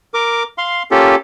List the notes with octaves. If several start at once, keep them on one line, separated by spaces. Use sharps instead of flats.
A#4 D6
F5 C6
A#3 C#4 F4 G4 A4